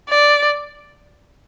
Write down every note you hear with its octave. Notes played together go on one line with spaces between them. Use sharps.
D5